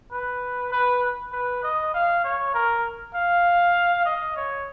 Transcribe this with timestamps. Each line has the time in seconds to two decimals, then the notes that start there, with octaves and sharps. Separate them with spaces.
0.12 B4
0.72 B4
1.32 B4
1.63 D#5
1.94 F5
2.24 C#5
2.54 A#4
3.14 F5
4.05 D#5
4.36 C#5